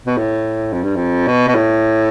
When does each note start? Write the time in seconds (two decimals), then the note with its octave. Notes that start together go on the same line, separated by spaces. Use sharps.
0.06 B2
0.17 A2
0.72 F2
0.83 G2
0.96 F2
1.27 B2
1.48 B2
1.55 A2